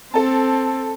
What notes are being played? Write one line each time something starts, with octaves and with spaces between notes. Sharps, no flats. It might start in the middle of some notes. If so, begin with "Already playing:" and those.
C4 A4 A5